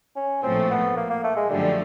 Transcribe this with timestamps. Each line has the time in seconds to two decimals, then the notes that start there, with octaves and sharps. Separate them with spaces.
0.16 C#4
0.43 A#1 A2 F3 A3 C4
0.71 B3
0.97 A#3
1.10 A#3
1.24 A3
1.36 G#3
1.50 F#2 D3 F3 G3 A3